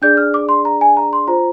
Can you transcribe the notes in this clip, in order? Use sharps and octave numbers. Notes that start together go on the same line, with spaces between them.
D4 G#4 D5 G6
F6
D6
C6
A#5
G#5
A#5
C6
F4 C5 A#5